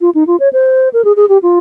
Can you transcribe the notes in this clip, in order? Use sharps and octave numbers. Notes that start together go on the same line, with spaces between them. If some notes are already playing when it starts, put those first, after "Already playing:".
F4
D#4
F4
C#5
C5
A#4
G#4
G#4
G4
F4